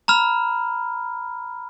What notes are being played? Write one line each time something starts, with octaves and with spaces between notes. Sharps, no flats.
A#5 B5 F6